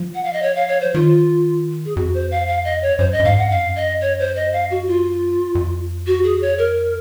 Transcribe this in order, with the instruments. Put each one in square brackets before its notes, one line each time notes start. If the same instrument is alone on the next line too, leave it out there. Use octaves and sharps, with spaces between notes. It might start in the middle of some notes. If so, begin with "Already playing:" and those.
Already playing: [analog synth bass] F3
[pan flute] F#5
F5
D#5
C#5
F5
C#5
C5
[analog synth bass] D#3 [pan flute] F4
[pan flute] G#4
[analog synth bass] F2 [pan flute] F#4
[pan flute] C5
F5
F5
D#5
C#5
[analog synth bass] F#2 [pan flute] C5
[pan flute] D#5
[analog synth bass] F#2
[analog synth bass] G#2 [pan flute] F5
[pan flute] F#5
[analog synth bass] F#2 [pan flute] F5
[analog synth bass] F2
F#2
[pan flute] D#5
C#5
C5
D#5
F5
F#4
F4
[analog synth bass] F2
[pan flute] F#4
G#4
C#5
A#4